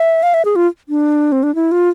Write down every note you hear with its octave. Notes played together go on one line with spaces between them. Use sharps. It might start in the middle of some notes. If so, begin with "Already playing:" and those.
Already playing: E5
F5
E5
G#4
F4
D4
C4
D4
E4
F4